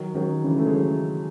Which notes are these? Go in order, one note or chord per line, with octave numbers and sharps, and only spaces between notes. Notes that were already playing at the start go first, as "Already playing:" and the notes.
Already playing: D#3 F#3
D#3 F#3
C#3 E3
A3
G#3
D#3 F#3